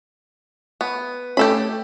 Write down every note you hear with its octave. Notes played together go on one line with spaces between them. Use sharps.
B3
A3 C#4 G4 A4 B5